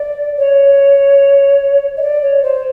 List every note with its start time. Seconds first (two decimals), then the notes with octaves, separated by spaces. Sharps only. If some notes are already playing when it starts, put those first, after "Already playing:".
Already playing: D5
0.37 C#5
1.97 D#5
2.01 D5
2.22 C#5
2.42 C5